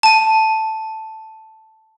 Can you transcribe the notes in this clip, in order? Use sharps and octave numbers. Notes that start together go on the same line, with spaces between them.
A5 D#7